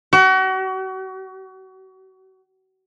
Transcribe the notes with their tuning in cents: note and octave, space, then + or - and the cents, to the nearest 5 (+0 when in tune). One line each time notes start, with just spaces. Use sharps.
F#4 +35